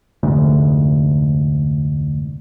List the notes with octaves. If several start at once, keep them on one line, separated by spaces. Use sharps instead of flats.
F1 D2 G#2